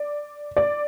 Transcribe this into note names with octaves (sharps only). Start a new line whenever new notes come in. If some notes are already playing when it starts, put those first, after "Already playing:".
Already playing: D5
D5